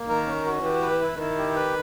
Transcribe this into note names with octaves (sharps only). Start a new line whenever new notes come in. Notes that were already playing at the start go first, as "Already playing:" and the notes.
Already playing: A#3
D#3 A#4
C#4
F#4
E3 G4
B4
E4
D#3 E4
G4
B4